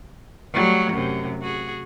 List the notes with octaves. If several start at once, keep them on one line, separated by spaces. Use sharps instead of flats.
F#3 G3 A3
F#2 C3
F#4 G#4